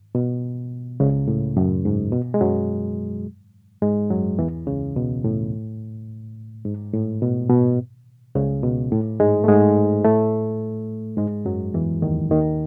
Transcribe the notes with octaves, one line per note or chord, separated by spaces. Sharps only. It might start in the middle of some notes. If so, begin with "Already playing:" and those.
B2
C#2 C#3
A2
F#2
G#2
B2
G#3
F#2 F#3
G#2 G#3
F#2 F#3
E2 E3
C#2 C#3
B2
A2
G#2
A2
B2
B2
C#2 C#3
B2
A2
G#2 G#3
A3
G#2 G#3
A2 A3
G#2 G#3
F#2 F#3
E2 E3
D#2 D#3
D#2 D#3